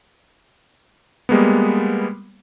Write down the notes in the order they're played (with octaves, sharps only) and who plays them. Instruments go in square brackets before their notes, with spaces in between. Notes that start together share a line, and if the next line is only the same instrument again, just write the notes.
[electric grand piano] G3 G#3 A#3 B3